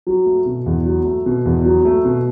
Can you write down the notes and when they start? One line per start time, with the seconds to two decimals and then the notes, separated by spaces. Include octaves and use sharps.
0.07 F#3
0.26 A3
0.46 B2
0.66 E2
0.86 F#3
1.05 A3
1.26 B2
1.46 E2
1.65 F#3
1.85 A3
2.05 B2